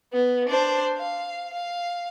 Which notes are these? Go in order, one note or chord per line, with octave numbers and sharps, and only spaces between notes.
B3
D4 C5
F5
F5